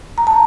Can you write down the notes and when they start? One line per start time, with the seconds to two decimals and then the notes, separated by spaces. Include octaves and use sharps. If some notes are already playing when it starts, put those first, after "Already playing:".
0.18 A#5
0.27 A5